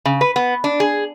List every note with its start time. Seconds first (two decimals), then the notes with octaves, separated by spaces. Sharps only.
0.05 C#3
0.21 B4
0.36 B3
0.64 D4
0.80 G#4